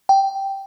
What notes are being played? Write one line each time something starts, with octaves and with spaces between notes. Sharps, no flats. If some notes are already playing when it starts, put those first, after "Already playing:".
G5